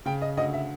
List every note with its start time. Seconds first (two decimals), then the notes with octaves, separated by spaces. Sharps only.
0.06 C#3 G5
0.21 D#5
0.37 D2 D#5
0.53 E5